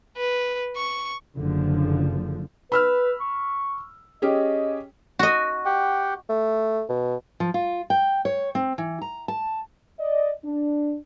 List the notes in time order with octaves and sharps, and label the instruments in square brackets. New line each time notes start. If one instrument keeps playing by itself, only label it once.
[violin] B4
C#6
[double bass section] F#1 D3 F3
[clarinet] B4 [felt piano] B5 E6 F6
[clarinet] C#6
[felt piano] C#4 G4 G#4 [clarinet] D#5
[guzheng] F#4 D#5
[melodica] G4 F#5 G5
[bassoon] A3
B2
[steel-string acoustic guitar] F3
F4
G5
C#5
C4
E3
A#5
A5
[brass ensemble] D5 D#5
D4